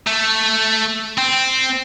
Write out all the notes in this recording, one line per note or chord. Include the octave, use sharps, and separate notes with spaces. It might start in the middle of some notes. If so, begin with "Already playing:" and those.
A3
C4